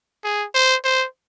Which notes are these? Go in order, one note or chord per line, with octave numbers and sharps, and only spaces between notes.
G#4
C5
C5